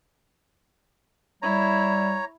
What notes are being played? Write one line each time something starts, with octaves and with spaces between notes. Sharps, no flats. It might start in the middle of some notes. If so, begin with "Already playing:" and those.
G3 E4 C#5 A#5